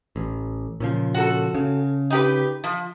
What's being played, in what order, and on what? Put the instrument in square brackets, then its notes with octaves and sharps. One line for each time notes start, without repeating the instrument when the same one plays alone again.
[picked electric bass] A1
A#2 C#3 F3
[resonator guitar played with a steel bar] F#4 A4
[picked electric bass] C#3
[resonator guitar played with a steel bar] D#4 G4 B4
F3